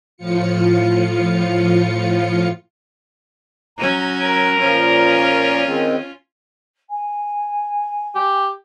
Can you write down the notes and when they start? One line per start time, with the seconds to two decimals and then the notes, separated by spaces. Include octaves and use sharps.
0.17 A2 F3 F4 C#7
3.78 F#3 C#4 A#5
4.25 A#4
4.59 A#2 F3 C#4 F4
5.67 D#3 G#3 C4
6.90 G#5
8.15 G4